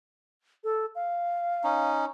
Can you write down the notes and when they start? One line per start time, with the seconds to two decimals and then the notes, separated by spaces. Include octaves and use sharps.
0.64 A4
0.95 F5
1.64 C#4 D#4